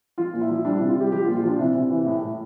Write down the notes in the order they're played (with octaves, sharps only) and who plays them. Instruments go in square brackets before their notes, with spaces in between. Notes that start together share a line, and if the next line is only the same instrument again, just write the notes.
[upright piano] F3 F4
A#2
E4
F3
G3 D4
C3 E4
F4
G3 G4
F3 G4
F4
A#2
F4
F3 D4
C3 E4
C3
E3
A2
A2